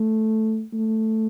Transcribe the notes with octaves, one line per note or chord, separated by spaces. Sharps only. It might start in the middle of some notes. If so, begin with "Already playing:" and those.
Already playing: A3
A3